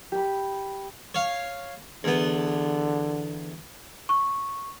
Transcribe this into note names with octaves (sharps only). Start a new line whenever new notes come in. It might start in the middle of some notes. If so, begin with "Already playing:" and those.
G4 B5
C#5 F5
E2 D3 B3
C#6